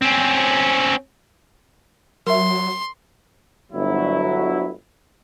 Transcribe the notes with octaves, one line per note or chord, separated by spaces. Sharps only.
C4 C#4
F#3 A#4 E5 C6
G1 D2 F#3 E4